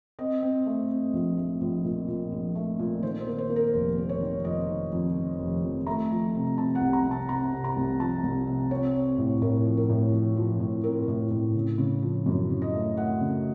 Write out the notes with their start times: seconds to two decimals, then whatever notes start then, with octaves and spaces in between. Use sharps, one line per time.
0.19 C4 D#5
0.43 C4
0.66 A3
0.90 C4
1.13 A#1
1.37 A3
1.61 A#1
1.85 A#2
2.08 A#2
2.32 A#1
2.55 A3
2.79 A#2
3.03 D#3 C5
3.21 C5
3.27 A#3
3.38 C5
3.50 A#3
3.56 A#4
3.74 F1 C5
3.98 A#3
4.09 C#5
4.21 D#3
4.45 F2 D#5
4.68 D#3
4.92 F2
5.16 D#3
5.40 F1
5.63 F2
5.87 A3 A#5
6.11 F3
6.35 C3
6.58 C3 A5
6.75 F#5
6.81 C2
6.93 A#5
7.05 C3
7.11 A5
7.29 C3 A#5
7.52 C3
7.64 A#5
7.76 C2
8.00 F3 A5
8.23 C2
8.47 C3
8.71 C4 C#5
8.95 C4
9.18 A2
9.42 A2 A#4
9.66 F3
9.77 A#4
9.90 A2
10.13 F3
10.37 F3
10.60 A2
10.84 C4 A#4
11.08 A2
11.31 A2
11.55 C#3
11.78 C#3
12.02 F3
12.26 F#2
12.50 C#3
12.62 D#5
12.73 A3
12.97 A3 F#5
13.21 C#3